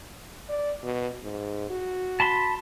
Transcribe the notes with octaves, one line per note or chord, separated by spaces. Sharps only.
D5
B2
G#2
F#4
A5 B5 C6